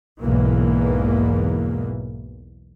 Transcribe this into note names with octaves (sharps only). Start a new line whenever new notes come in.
B1 E2 G#2 B2 E3 A#3